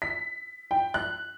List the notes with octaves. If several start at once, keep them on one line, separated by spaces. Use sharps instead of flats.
B6
G5
F#6